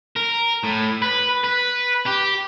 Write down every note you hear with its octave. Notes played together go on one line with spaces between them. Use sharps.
A#4
A2
B4
B4
G4